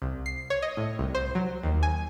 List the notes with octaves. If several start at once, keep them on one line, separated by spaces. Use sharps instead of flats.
C2
C7
C#5
D#5
A2
C2
C5
F#3
D#2
G#5